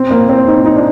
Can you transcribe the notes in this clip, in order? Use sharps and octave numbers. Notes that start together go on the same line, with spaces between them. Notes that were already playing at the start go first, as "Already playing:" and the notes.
Already playing: C4
A#3
C4
D#4
D#4
D4